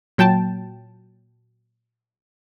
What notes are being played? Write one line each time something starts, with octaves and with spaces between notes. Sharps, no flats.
A#2 F#3 G5 A5